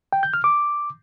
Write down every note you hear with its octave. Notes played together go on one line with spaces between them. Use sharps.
G5
G6
F6
D6